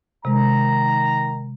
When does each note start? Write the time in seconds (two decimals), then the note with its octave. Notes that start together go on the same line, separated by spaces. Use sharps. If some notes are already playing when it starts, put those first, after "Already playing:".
0.25 C3 D#3 G#3 A#5